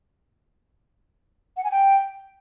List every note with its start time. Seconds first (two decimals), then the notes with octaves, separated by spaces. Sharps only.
1.57 F#5
1.64 G#5
1.71 G5